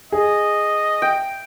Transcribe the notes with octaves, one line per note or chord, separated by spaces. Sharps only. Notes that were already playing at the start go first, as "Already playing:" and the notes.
G#4 D#5
G5